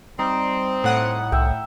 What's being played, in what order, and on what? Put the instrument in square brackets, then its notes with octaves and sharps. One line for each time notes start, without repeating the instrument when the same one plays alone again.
[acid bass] G3 [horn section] C4 [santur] D#4
[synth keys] A2 F#5 D#6
[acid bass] C2 [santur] E5 G5